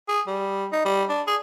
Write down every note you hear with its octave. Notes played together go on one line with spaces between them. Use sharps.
G#4
G3
D#4
G3
D4
G#4